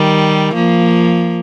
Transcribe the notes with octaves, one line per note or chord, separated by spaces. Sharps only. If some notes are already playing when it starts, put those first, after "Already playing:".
Already playing: D#3 G3
F3 A#3